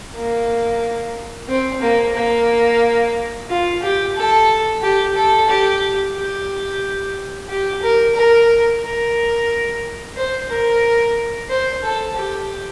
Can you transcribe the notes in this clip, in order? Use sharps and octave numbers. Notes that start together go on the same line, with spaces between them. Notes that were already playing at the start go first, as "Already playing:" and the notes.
A#3
C4
A#3
A#3
F4
G4
A4
G4
A4
G4
G4
G4
A#4
A#4
A#4
C5
A#4
C5
A4
G4